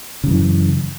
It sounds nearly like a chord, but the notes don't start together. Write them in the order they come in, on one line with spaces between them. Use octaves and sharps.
C#3 F#2 E3